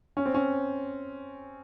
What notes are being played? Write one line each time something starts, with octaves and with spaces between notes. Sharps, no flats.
C#4
C4
C#4